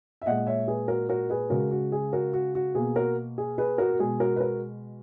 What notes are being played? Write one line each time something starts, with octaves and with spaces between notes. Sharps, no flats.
E5
A#2 G#3 D#5 F#5
C#5 E5
G#4 B4
F#4 A#4
F#4 A#4
G#4 B4
C#3 G#3 F#4 A#4
F#4
G#4
F#4 A#4
F#4
F#4
B2 A#3 G#4
F#4 A#4
G#4
G#4 B4
F#4 A#4
F#4
B2 G#3 G#4
F#4 A#4
B4
F#4 A#4